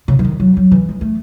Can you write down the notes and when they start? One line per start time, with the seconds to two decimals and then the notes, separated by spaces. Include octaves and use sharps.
0.08 C#3
0.19 E3
0.24 D#3
0.40 F#3
0.57 F#3
0.72 E3
0.89 G#3
1.01 A3